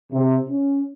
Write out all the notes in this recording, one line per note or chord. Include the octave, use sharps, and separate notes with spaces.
C3
C#4